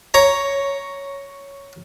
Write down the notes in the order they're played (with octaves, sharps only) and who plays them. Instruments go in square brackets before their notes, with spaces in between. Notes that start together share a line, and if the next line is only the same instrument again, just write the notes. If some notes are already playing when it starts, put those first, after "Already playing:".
[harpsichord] C#5 A#5